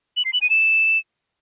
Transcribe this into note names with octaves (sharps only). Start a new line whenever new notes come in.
F#7
C7
F#7
D#7
E7